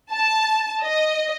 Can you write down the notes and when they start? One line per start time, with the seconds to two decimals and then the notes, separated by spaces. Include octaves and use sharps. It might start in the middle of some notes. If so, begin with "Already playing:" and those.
0.12 A5
0.83 D#5